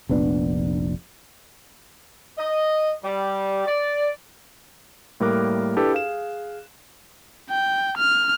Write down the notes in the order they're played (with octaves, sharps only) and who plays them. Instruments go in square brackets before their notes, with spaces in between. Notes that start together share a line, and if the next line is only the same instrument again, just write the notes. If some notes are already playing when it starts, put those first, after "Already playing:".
[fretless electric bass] F1 A#1 B3 D4
[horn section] D#5
G3
D5
[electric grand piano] A2 G3 A#3 A#4 D6 F#6
D4 E4 G4 A4 B4
G#4 F5 E7
[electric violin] G5
F6